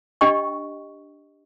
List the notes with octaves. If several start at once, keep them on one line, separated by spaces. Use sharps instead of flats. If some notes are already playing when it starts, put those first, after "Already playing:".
D4 G4 D#5 G5 C#6